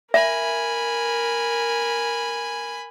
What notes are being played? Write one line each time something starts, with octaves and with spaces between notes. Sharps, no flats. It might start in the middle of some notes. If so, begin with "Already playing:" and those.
A#4 E5 G#5 B5